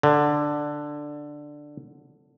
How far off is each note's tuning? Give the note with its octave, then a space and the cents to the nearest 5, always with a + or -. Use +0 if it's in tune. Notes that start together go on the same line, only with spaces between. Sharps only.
D3 +5